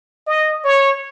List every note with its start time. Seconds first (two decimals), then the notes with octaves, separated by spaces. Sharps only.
0.27 D#5
0.65 C#5